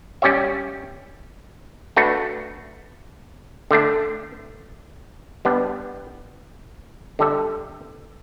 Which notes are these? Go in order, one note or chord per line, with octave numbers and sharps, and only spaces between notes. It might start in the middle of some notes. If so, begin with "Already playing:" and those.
G3 C#4 G4 C#5 E5
A3 D4 F#4 B4
D3 A3 D4
G3 B3 D4
D3 G3 D4 A4 E5